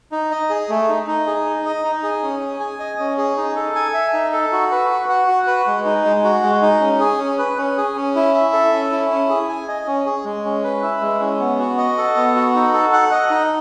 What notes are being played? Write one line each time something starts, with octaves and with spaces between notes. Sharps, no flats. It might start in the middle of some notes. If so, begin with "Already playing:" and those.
D#4
D#5
G#4
A3
D#4
D#4
G#4
D#4
D#5
D#4
G#4
C#4
G#4
G#5
D#5
C#4
G#4
D#4
A4
G#5
E5
D#4
A4
F#4
B4
F#4
F#5
F#4
B4
G#3
D#4
G#3
F#4
G#3
D#4
C#4
G#4
C#4
B4
C#4
G#4
C#4
E4
E5
A4
C#4
E4
C#4
G#4
G#5
D#5
C#4
G#4
G#3
C#4
B4
E4
G#3
C#4
B3
F#4
D#5
A4
B3
F#4
D#4
A4
F#5
D#5
D#4